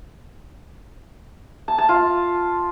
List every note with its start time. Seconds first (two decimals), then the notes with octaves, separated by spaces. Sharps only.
1.68 A5
1.78 A5
1.89 F4